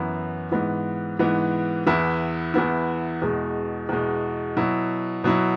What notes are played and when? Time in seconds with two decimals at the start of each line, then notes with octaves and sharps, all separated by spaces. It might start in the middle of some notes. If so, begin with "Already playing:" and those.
Already playing: F#2 E3 B3 E4
0.52 G#2 E3 B3
1.19 G#2 E3 B3
1.86 E2 E3 B3 E4
2.54 E2 E3 B3 E4
3.22 E2 B2 G#3
3.89 E2 B2 G#3
4.57 B2 F#3 E4
5.24 B2 F#3 E4